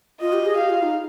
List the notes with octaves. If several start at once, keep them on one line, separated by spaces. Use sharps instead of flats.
F4 D#5
G4
G#4
G4 F5
F4
D#4